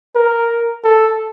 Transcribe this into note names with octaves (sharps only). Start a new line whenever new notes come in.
A#4
A4